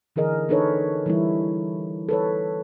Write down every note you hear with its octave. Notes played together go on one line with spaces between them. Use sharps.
D3 E3 G#4 A#4 D#5
D4 D#4 A4 B4 C#5
E3 G3 E4
A4 B4 C#5